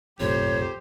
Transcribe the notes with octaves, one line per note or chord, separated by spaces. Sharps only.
F#1 B1 F2 A2 G4 C5 C#5